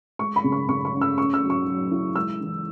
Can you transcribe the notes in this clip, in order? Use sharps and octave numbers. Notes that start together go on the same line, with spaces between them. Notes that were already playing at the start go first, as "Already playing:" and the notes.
G#3 C#6
B5
C#3
C#6
C#3 C#6
C#6
C#4
E6
C#4 C#6
E6
F#3
C#6
F#3
E4
G#3 E6
E3